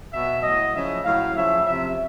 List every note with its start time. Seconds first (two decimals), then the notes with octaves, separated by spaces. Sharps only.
0.13 B2 F#3 E5
0.43 A2 F#3 D#5
0.74 C#3 F3 E5
1.04 A2 F#3 F5
1.35 C#3 F3 E5
1.65 C3 F3 E5